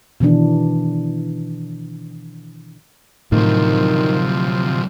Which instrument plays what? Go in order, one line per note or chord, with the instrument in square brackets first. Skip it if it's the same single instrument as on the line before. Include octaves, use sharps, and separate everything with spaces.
[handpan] B2 D#3 E3 D4
[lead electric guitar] D2 F#3 [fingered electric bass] A2 [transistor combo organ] C3 F3 [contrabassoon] D#3